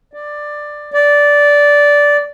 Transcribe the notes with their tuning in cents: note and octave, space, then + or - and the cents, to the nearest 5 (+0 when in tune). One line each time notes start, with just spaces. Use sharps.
D5 +10
D5 -10